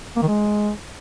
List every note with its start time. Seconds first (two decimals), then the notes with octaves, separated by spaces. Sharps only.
0.16 A#3
0.22 D#3
0.28 G#3